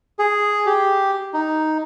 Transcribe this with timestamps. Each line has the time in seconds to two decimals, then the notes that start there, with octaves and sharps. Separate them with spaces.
0.19 G#4
0.66 G4
1.34 D#4